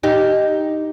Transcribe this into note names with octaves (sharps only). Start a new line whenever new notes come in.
D#4 G4